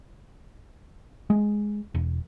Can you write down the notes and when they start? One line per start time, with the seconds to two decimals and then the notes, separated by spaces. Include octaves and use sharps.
1.30 G#3
1.95 E1